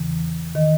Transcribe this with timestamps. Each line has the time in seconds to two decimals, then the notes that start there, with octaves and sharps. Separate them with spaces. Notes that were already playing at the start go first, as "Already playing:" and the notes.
Already playing: E2 C#3 E3
0.55 D#3 D#5